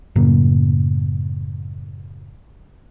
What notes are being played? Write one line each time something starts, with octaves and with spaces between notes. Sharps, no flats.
F#2 A2 C#3 A#3